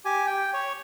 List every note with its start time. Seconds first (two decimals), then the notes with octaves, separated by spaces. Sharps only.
0.05 G4 G#5
0.27 G5
0.54 C#5